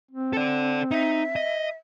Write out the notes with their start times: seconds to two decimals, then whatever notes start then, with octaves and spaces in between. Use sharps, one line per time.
0.11 C4
0.33 A4 D5
0.91 D#4 E5
1.36 D#5